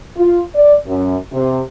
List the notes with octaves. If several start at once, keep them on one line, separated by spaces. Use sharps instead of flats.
F4
D5
F#2
C3